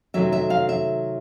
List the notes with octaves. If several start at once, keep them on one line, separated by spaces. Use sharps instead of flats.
C3 D#3 F#3 A3 E5
E5
F5
E5